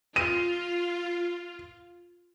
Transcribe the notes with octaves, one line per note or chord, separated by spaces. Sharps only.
F4 D#7